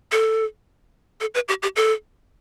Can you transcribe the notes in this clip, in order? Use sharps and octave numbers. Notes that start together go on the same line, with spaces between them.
A4
A4
B4
G4
G4
A4